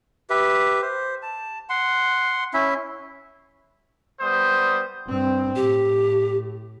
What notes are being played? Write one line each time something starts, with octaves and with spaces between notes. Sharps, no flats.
G4 B4 E5
C5
A5
F#5 C6
C#4 E4 E5
G3 B3 C5 D#6
G2 C4
A2 G4